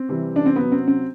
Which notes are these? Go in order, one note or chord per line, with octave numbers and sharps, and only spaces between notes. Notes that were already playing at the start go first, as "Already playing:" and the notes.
Already playing: C4
C3 E3 G3
D4
C4
C3 F#3 B3
C4
C4